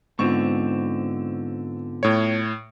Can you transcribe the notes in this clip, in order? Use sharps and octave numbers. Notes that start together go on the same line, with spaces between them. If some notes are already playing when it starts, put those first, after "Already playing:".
G#2 D3 B3 C4 F4 C#6
A2 C#5